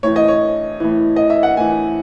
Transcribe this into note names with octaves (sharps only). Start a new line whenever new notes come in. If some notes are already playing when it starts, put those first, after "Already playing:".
A2 E3 C#5
D#5
C#5
A2 E3
D#5
E5
F#5
A2 E3 G#5